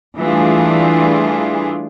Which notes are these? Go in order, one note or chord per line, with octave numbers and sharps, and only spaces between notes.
E3 G3 A3 D4 F4 G#4